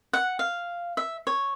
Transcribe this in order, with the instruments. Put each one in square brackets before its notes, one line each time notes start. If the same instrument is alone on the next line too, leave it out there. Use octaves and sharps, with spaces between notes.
[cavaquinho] F#5
F5
E5
C#5